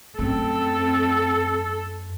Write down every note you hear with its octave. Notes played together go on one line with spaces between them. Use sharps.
F#2 A3 C4 A4